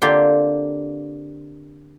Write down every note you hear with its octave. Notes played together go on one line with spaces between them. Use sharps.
D3 A#3 C4 F4 G4 G5